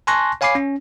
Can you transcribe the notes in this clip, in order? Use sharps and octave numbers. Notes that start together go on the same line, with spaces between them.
G#5 A5 C6 C#6 F#6 A#6
C#5 F5 G#5 B5 D6 C7
C#4